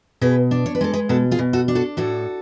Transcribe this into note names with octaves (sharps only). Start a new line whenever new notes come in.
B2 G#4 B4
D4
C#5
B4
G#3 A4
G#4 B4
B2 F#4 A4
F4 G#4
B2
F#4 A4
D4
F#4 A4
A2 F#4 A4